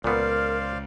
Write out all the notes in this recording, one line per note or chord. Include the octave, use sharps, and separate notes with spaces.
C#2 A#2 B3 A#4 C5 D5 F5